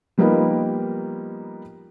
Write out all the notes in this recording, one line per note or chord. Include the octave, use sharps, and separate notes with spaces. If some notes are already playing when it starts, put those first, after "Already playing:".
F3 G3 A#3 B3 D#4 A#4